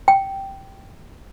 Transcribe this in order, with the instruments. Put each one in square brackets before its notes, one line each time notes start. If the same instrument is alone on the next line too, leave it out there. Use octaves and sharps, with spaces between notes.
[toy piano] G5